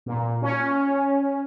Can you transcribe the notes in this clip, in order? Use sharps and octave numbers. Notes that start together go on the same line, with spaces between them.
A#2
C#4